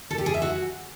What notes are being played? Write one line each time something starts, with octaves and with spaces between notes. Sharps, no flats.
A4
G4
G#4
E5
F#4